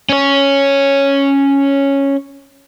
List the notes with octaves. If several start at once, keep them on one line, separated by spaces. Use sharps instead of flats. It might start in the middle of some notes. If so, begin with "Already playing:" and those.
C#4 C#5